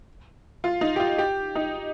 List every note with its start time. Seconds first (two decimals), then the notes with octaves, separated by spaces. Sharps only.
0.64 F4
0.81 D#4
0.96 G4
1.00 F4
1.18 G4
1.55 D#4